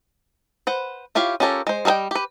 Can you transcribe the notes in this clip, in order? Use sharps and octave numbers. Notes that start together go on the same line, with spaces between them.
B4 C5 F#5
E4 F4 G4 C#5 F5
C#4 F4 G4 A4 A#4
G#3 C5
G3 G#4 A#4 D#5 G5
G4 B4